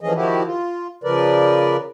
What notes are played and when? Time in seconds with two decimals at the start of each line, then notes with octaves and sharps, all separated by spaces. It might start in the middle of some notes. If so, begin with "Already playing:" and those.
0.01 E3 F3 A3 C#4 G#4 D#5
0.15 D#3 F3 E4 F#4 G4
0.45 F4
1.04 C#3 F3 A#4 B4 D5